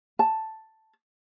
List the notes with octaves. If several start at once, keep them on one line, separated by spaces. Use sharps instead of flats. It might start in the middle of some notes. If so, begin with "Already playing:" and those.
A5